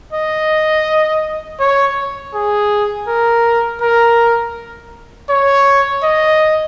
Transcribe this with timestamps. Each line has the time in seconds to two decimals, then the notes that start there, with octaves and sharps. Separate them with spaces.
0.13 D#5
1.60 C#5
2.34 G#4
3.08 A#4
3.82 A#4
5.30 C#5
6.03 D#5